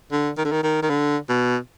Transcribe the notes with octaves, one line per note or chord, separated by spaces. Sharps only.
D3
D#3
D3
D#3
D#3
D#3
D3
B2